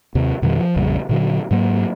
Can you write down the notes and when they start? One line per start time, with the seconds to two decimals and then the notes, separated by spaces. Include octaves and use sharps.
0.15 D#2 C3
0.42 F2 B2 D#3 G3
0.59 F3
0.76 A#1 F2 C#3 G3
1.09 A#2 D3 F#3
1.51 G#2 F#3 A#3